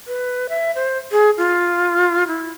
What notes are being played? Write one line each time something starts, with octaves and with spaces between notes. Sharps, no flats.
B4
E5
C5
G#4
F4
E4